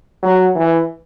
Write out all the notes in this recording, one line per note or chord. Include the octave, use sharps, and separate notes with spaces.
F#3
E3